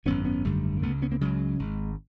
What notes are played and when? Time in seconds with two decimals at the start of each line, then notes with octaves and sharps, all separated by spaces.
0.05 G#1 F#2 D3 B3 C#4
0.25 B3 C#4
0.45 G#1 F#2 D3 G3 A3
0.77 A#3
0.82 C#2 A3 B3
0.87 C#3
1.02 B3 C#4
1.11 A#3 C4
1.21 C#2 C#3 F#3 G#3
1.59 G#1 G#2